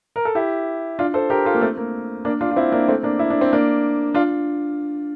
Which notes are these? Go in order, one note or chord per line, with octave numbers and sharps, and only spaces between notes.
A#4
A4
E4 G4
D4 F4
A4 C5
G4 A#4
F4 A4
A#3
A3 C4
A#3
A#3 D4
D4 F4
F4
C4 E4
A#3 D4
A3 C4
A#3 D4
E4
D4
C4
A#3 D4
D4 F4